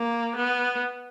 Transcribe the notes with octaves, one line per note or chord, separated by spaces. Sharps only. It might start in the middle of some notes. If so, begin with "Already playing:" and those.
Already playing: A#3
B3